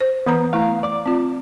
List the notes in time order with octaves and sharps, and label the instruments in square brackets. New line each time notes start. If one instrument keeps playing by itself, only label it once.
[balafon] C5
[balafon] E3 B4 A#5 [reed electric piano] B3
[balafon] A3 E4 [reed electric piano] F5 A#5
[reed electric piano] D5 D6
[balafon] C4 F4